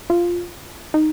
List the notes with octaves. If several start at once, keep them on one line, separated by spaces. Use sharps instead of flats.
F4
D#4